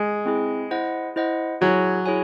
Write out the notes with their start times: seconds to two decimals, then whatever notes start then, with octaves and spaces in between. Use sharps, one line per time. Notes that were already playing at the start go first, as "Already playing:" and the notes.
Already playing: G#3
0.26 C4 E4 G#4
0.71 E4 C5 D#5 F#5
1.16 E4 C5 D#5 F#5
1.61 F#3 E4 G#4 C#5 G#5
2.06 E4 G#4 C#5 G#5